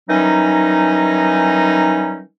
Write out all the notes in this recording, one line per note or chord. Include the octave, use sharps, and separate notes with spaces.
D#3 E3 F#3 G3 C#4 D#4